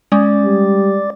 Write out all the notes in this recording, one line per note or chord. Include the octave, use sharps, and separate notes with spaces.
G#3 C#4 D5
G3